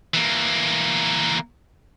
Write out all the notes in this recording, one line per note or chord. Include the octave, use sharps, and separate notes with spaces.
E3 A#3